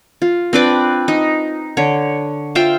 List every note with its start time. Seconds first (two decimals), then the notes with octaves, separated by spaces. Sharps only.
0.22 F4
0.53 C4 D4 B4 D5
1.08 D#4
1.77 D3 C#5
2.55 F4 C5 E5 G5